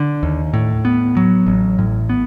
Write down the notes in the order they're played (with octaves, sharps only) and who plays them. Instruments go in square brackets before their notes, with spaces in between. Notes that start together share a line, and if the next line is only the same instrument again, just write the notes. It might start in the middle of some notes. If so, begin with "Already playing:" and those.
Already playing: [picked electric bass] D3
D#2
A2
B3
F#3
A1
A2
B3